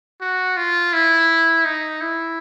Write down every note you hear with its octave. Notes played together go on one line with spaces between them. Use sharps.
F#4
F4
E4
D#4
E4